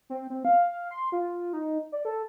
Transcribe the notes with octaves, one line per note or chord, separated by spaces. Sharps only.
C4
C4
F5
C6
F4
D#4
D5
A4